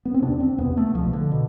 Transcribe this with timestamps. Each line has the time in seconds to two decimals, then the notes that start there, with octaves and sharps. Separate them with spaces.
0.05 B3
0.14 C4
0.22 E2 C3 D4
0.40 C4
0.58 E2 C3 B3
0.77 A3
0.94 C2 B2 F3
1.13 D3
1.32 B2